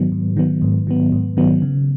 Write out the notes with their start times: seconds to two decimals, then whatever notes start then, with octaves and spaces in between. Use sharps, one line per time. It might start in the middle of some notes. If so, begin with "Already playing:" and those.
Already playing: G#2 D#3 F#3 B3
0.12 G#2
0.37 D#3 F#3 B3
0.62 G#2
0.87 D#3 F#3 B3
1.12 G#2
1.37 D#3 F#3 B3
1.62 C#3